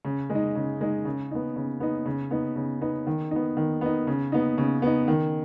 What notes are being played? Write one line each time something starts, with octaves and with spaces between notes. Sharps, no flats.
C#3
G#3
D#4
C#3
G#3 D#4
C#3
B3 D#4
C#3
B3 D#4
C#3
B3 D#4
C#3
B3 D#4
D#3
B3 D#4
D#3
B3 D#4
C#3
B3 D#4
C#3
B3 D#4
D#3